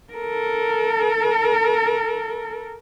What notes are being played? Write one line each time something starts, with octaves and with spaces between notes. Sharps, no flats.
A4 A#4